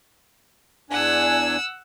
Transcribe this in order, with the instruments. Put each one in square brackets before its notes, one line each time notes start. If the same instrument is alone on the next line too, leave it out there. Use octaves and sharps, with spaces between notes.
[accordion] E2 D4 G#5 [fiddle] F#5 E6